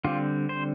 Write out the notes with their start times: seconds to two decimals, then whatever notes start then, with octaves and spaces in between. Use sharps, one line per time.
0.04 D3 G3 C4 F4
0.49 C5